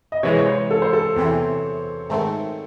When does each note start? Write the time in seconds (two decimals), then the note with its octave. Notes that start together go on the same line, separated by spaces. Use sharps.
0.12 D#5
0.23 C3 E3 G#3 C#5
0.38 C#5
0.47 C5
0.71 A4
0.82 C5
0.93 A4
1.16 E2 C3 E3 C4
2.10 G#2 D#3 A3 C4